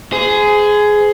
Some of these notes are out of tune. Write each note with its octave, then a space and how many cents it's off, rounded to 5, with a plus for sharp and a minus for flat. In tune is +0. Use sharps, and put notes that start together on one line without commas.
G#4 +10 C5 -40